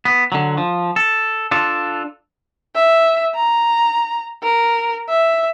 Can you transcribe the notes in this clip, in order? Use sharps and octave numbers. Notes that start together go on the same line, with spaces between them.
B3
D3 F#3
F3
A4
D4 F4 A4
E5
A#5
A#4
E5